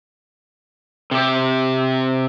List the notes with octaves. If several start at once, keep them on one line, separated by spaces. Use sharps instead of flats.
C3 G4